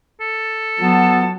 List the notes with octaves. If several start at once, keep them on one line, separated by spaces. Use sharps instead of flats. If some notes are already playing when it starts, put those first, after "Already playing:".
A4
F#3 B3 A5